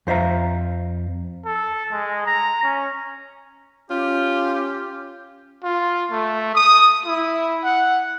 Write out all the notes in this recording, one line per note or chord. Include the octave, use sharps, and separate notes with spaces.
F2 C5 E5 F5 A#5
A4
G#3
A#5
C#4
C#4 F4 G4
F4
A3
D#6
E4
F#5